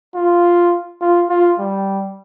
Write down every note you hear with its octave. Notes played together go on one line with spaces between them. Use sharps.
F4
F4
F4
G3